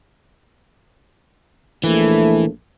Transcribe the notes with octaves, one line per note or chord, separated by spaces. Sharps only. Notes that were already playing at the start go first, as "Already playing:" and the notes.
A#1 E3 A3